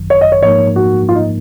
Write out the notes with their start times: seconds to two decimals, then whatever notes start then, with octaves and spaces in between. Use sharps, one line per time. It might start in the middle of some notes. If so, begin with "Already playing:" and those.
Already playing: G#1 F#2 D#3 F#3
0.10 C#5
0.21 D#5
0.32 C#5
0.43 G#2 F3 A#3 D#4 A#4 C#5
0.76 F#4
1.09 F4
1.15 D#4